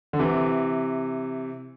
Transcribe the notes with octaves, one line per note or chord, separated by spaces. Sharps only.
D3
C3 E3